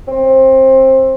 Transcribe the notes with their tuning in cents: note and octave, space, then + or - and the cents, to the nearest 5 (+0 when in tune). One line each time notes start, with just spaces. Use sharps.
C4 +20